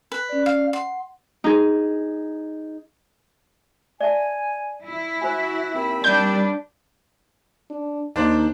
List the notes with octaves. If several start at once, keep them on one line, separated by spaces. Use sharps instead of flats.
B4
C#4 D5
F5
F#5 C6
D#4 G#4
D5 E5 G#5 A5
E4
F#4 C5 G#5
D#2 C4 B5
G3 D4 D5 C6 G6
D4
D#2 D4 D#4 C5 D5